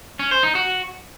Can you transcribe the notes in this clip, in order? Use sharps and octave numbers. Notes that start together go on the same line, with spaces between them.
C#4
C5
D#4
F#4